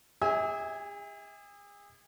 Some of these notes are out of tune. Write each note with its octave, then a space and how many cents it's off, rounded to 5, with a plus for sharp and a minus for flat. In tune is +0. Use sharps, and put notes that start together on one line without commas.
G#4 -40 E5 -35 G#5 +0